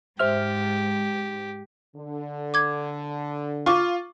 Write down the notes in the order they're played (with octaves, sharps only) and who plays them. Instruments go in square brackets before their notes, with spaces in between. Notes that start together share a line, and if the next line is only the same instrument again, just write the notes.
[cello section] G#2 [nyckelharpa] G4 [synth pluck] C5 E5 F6
[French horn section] D3
[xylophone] D6 G#6
[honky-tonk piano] F4 [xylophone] C#6 D6